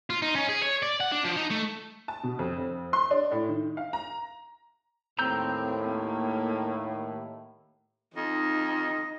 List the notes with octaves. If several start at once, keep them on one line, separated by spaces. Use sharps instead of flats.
F4
D#4
C#4
G#4
C#5
D5
F#5
D4
F3
D#4
A3
A5
B2
F2
F2
C6
D4
A2
D#3
F5
A#5
D#2 A2 C4 A#5 E6 G6
A#3
F2 D#4 D#5